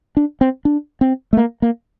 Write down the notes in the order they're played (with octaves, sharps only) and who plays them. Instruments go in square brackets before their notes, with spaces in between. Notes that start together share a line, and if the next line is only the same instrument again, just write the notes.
[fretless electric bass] D4
C4
D4
C4
A3
A#3
A#3